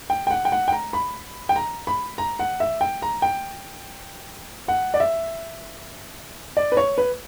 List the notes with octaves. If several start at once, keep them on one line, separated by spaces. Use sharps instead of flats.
G5
G5
F#5
G5
F#5
G5
A#5
B5
G5
A#5
B5
A#5
F#5
E5
G5
A#5
G5
F#5
D5
E5
D5
B4
C#5
B4